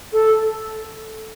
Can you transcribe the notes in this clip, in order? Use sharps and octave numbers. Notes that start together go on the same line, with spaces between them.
A4